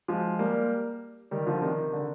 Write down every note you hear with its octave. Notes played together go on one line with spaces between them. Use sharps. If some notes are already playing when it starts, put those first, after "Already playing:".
F3 G#3
G3 A#3
D#3 G3
D3 F3
C3 D#3
D3